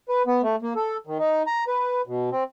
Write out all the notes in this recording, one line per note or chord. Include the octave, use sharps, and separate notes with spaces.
B4
B3
A3
A#3
A4
D#3
D#4
A#5
B4
B2
C4